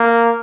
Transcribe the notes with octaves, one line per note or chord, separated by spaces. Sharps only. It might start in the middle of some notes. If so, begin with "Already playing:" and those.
Already playing: A#3